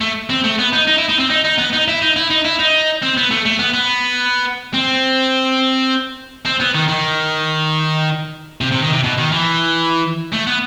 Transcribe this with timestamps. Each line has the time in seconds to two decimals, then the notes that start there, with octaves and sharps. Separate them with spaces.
0.01 A3
0.30 C4
0.44 A3
0.59 B3
0.73 D#4
0.87 D#4
0.98 E4
1.09 D#4
1.19 C4
1.30 D#4
1.45 D#4
1.58 B3
1.73 D#4
1.88 E4
2.02 D#4
2.16 E4
2.30 D#4
2.45 E4
2.59 D#4
3.02 C4
3.17 B3
3.31 A3
3.45 A3
3.59 B3
3.74 B3
4.74 C4
6.46 C4
6.61 B3
6.74 D#3
6.89 D#3
8.61 C3
8.72 C3
8.82 D#3
8.93 C3
9.04 B2
9.18 D#3
9.32 E3
10.33 A3
10.47 B3